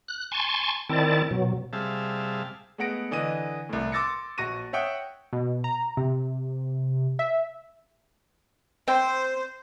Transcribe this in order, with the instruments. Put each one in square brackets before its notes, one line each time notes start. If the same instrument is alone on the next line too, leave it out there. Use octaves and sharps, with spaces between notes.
[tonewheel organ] F#6
G#5 A5 C6 C#6
D#3 C4 E4 D5 A5
B2 F#3
[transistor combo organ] C3 G3 G#4 E5 F5 A5
[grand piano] G#3 A3 B3 F#5 A#6 D7
D3 E3 D#5 D#7
C2 A2
C6 D6 E6 A6 A#6 C#7
A#1 F#4 C#6 A#6 D#7
C#5 E5 F#5 G5 D#6
[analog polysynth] B2
A#5
C3
E5
[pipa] C4 G5 [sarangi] C5